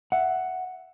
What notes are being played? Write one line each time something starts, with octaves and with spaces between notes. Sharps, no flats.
E5 F#5